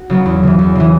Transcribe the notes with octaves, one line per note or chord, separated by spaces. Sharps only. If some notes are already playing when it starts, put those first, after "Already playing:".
Already playing: F#4
C#3 F#3 B3
E2
C#3 E3
E2
C#3 E3